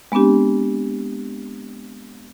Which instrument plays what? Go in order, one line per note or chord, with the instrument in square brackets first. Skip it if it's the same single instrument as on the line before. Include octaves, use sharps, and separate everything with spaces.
[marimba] G#3 B3 C4 D4 G4